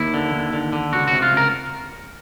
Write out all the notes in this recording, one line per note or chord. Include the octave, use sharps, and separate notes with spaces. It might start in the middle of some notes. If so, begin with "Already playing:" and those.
Already playing: D#2 E4
D3
D#2
D3
D3
C#2 F#4
F#4
C3
F4
C#2
A#4